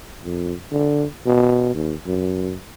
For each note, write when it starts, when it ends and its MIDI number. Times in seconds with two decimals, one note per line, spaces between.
0.24 0.53 41
0.72 1.06 50
1.26 1.70 47
1.74 1.94 39
2.06 2.54 42